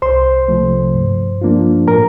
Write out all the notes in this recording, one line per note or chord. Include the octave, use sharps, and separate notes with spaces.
C2 C5 C6
C3 F3 A3
G2
F3 A#3 D4 F4
A2 A#4 A#5